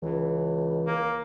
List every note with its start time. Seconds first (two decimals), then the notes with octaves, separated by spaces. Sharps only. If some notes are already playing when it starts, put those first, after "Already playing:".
0.03 C#2 E3
0.87 A#3